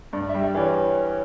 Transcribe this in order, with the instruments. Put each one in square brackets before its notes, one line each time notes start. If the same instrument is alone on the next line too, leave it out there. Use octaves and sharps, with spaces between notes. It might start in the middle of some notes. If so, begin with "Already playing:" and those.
[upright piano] G2 [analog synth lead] D5
[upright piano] G3 [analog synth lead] E5
[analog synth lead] D5
[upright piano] E3 [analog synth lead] C#5